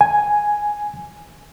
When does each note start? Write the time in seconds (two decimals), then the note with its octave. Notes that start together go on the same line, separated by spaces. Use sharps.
0.01 G#5